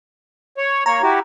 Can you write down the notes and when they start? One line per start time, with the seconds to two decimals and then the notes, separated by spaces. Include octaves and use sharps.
0.58 C#5
0.86 A#3 C#5 A#5
1.02 E4 F#4 G4